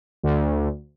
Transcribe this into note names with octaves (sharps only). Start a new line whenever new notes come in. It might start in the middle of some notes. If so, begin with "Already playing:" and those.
D2